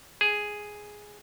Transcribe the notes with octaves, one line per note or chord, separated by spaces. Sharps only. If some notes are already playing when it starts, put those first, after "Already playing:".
G#4